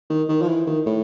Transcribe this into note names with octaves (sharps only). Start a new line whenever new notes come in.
D#3
D#3
F3
E3
D#3
A2